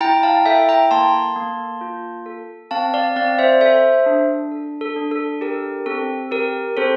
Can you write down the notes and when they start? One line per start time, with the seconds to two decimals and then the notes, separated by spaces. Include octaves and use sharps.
0.01 E4 G5 A#5
0.23 F5 A5
0.46 A4 E5 G5
0.69 G5 A#5
0.91 A#3 A5 C6
1.36 A#3
1.81 F4
2.26 A4
2.71 C4 F5 A5
2.94 D5 F5
3.16 C4 D5 F5
3.39 C5 E5
3.61 A4 C5 E5
4.06 D4
4.51 A4
4.81 A4
4.96 D4
5.12 A4
5.41 G4 A#4
5.86 C4 A4
6.31 G4 A#4
6.77 C4 A4 C5